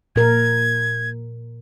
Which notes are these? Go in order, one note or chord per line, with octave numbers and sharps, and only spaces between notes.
A#2 A#4 G#6